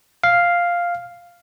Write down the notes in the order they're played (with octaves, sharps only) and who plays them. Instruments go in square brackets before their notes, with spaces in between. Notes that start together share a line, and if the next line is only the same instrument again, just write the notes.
[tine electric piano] F5